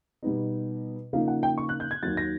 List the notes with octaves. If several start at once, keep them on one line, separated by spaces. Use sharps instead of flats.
B2 G3 B3 D#4
C#3 F3 A#3 D#4 F5
F#5
G5
C#6
F#6
G6
G#6
D#2 D#3 F#3 A6
A#6